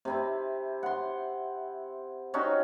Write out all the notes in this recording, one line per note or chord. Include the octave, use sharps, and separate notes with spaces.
C3 C4 E4
F#5 C6
C4 C#4 D#4 F#4